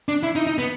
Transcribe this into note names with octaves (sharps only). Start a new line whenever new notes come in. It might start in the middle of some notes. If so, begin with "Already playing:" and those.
D4
E4
D#4
D#4
B3